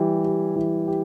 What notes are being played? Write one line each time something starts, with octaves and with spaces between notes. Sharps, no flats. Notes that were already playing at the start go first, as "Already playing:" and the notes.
Already playing: E3 G3 G4
G4
E3
G4